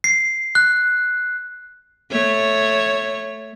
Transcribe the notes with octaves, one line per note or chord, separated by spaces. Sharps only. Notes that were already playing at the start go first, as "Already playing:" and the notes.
C7
F#6
A3 C#5